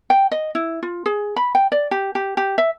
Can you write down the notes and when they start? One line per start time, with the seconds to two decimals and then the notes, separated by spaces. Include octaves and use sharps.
0.10 G5
0.31 D#5
0.55 E4
0.83 F4
1.06 G#4
1.36 B5
1.55 G5
1.72 D5
1.91 G4
2.15 G4
2.37 G4
2.58 E5